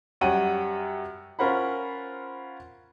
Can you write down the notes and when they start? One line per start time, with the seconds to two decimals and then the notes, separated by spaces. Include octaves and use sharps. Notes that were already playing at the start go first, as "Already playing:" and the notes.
0.21 F#2 G3 C#5 F#5 G5 D#7
1.39 C#4 F4 A#4 C5 F#5 B5